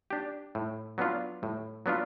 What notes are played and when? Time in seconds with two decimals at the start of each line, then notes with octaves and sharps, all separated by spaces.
0.10 D4 G4
0.55 A2
0.98 F#3 B3 D4 F4
1.43 A2
1.86 F#3 B3 D4 F4